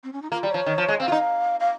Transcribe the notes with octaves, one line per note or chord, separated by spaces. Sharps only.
C4
C#4
D#4
A#3 F4
G3
C#5
F3
D#3
F3
G#3
C4 F5
F4
D#4
F5